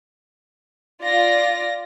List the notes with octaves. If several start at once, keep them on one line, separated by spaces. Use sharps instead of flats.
F4 D5 A#6